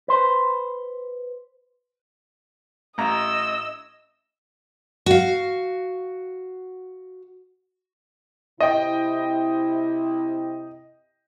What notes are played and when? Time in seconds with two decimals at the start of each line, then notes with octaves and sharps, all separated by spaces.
0.08 B4 C5
2.98 A1 D#5 A#5 E6
5.06 F#4 F5
8.60 C3 E4 D#5 G5